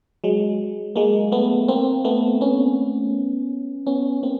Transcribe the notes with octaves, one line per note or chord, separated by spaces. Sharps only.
F#3 G#3
G#3 A#3
A3 B3
A#3 C4
A3 B3
B3 C#4
B3 C#4
A#3 C4